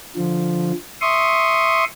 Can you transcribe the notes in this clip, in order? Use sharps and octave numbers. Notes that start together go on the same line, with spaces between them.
D3 F3
E5 C6 C#6 D#6